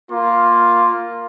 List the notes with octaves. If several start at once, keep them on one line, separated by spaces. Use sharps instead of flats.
A#3 F4